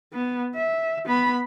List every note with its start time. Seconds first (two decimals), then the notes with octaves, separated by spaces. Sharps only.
0.13 B3
0.55 E5
1.05 B3 B5